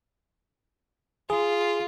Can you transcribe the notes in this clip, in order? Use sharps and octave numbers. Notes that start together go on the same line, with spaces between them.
F4 G#4